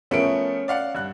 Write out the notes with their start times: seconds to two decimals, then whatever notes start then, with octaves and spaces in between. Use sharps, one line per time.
0.11 F3 A3 B3 C#4 A#4 D7
0.68 D5 F5 F#5
0.95 G2 F#6